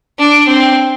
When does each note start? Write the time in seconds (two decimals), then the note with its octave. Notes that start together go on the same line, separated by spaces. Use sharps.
0.19 D4
0.48 C4